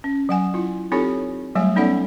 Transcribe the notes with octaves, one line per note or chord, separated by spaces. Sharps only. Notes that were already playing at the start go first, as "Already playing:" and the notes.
C#4
F#3 F#5 G#5
E4 F4
C4 D#4 F4 G4 A4 C#5
F#3 G3 A3 C#5 G#5
B3 C#4 D#4 A4 D5 F#5